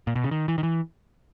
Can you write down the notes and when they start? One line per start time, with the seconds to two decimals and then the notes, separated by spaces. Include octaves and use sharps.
0.07 A#2
0.16 B2
0.24 C#3
0.31 D#3
0.48 E3
0.58 D#3
0.63 E3